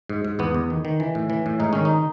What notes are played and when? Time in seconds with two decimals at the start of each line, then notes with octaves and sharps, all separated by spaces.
0.09 G#2
0.25 G#2
0.39 E2 B3
0.54 E2
0.70 D#3
0.85 D#3
1.00 E3
1.15 A2
1.30 E3
1.46 A2
1.60 G#2 D#4
1.73 D#3 C#4
1.85 D#4